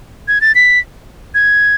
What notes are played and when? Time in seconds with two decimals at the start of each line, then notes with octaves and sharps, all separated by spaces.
0.28 G#6
0.41 A6
0.55 B6
1.35 G#6